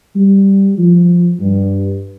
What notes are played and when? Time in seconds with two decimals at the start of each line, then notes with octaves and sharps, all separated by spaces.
0.15 G3
0.77 F3
1.40 G2